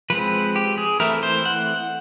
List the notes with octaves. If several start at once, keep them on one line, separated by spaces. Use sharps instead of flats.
F3 G#3 C4 B4
G4
G#4
E3 A3 C4 E4 A#4
C5
F#5